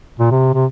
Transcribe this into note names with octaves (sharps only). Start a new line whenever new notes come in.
A#2
C3
C3